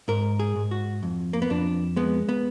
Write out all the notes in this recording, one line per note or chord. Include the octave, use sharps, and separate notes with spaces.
G#2 A#4
G#4
G#2
F#4
F2
A#3
B3
F2 D4
G#3 B3
B3